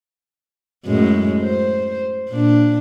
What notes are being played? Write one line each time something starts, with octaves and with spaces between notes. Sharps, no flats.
F#2 A2 G#3
C5
A#2 D4